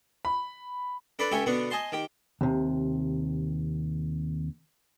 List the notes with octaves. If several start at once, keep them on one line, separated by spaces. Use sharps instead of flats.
B5
D4 A4 B4 D5 B5
C#2 G4 A4 C#5 E5 G#5
B2 D3 B3 D4
D#5 G#5 A5 C6
D#3 G4
D#2 C3